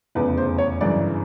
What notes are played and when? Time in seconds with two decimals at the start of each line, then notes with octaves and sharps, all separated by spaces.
0.15 F1 E2 C#3 B4
0.37 C5
0.58 C#5
0.81 G1 F#2 C#3 E3 D5